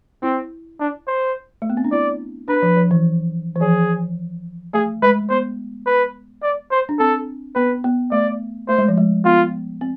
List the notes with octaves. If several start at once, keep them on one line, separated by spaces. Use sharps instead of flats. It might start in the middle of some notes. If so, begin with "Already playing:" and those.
C4 E4
D4
C5
A3
B3
C4
D4
E4 D5
D4 B4
F3
F3
E3
E3
F3 G#4
A3 G#4
G#3 B4
B3 C5
B4
D5
C5
D4
C4 A4
B3 B4
B3
A3 D5
A3 C5
G#3
F3
G#3
B3 F4
C4